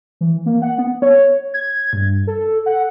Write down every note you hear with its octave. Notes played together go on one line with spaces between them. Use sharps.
E3
A#3
F#5
B3
C#5
G#6
G2
A4
F#5